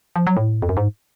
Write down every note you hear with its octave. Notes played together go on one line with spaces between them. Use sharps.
F3
F#3
A2
F2
F#2
G#2